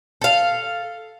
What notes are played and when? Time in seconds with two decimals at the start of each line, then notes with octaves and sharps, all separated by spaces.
0.21 A4 F5